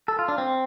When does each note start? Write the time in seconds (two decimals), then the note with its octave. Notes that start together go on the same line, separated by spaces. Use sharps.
0.08 A4
0.19 F4
0.28 D4
0.38 C4